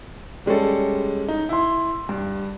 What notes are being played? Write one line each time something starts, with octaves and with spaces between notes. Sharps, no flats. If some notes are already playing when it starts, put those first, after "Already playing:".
G3 G#3 C#4 A4
D#4
E4 C6
G2